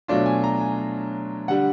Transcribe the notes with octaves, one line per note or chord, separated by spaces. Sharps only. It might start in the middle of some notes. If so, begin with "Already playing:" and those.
B2 F#3 A3 D4 F4
G#5
A#5
G#5
D3 G3 F#5